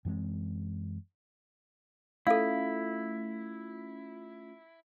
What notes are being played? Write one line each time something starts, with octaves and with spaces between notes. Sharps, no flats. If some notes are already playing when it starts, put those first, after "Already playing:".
F#2 E3 G#3 C4
A3 C#4 E4 F4 A4 F5